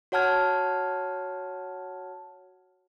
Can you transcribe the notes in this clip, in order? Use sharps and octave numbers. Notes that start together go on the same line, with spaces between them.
F#4 C#5 F#5 A5 F6 G#6